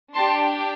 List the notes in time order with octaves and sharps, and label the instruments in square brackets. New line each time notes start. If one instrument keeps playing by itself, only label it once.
[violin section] D4 G4 A5 C6